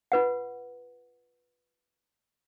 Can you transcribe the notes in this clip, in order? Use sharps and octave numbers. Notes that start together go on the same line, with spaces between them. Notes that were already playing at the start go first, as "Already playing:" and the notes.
F4 B4 F#5